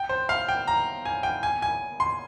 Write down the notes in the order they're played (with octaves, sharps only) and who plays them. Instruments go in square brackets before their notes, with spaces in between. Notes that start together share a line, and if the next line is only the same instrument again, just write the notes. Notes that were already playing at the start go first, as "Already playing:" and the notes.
Already playing: [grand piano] G5
C5
F5
G5
A#5
G#5
G5
G#5
G#5
C6